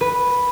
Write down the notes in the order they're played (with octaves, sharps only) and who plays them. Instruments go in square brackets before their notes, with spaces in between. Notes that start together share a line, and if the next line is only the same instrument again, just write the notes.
[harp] B4